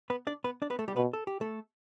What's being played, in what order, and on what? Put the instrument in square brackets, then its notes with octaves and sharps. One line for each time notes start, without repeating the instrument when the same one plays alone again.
[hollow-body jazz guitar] B3 B4
D4 D5
B3 B4
D4 D5
B3 B4
A3 A4
G3 G4
[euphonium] B2 [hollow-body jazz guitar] B3 B4
[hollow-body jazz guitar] A4
G4
A3 A4